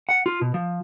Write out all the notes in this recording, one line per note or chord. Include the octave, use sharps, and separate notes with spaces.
F#5
F4
B2
F3